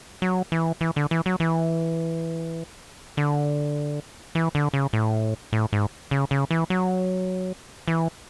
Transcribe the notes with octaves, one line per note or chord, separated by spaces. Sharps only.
F#3
E3
E3
D3
E3
F#3
E3
D3
E3
D3
C#3
A2
A2
G#2
C#3
C#3
E3
F#3
E3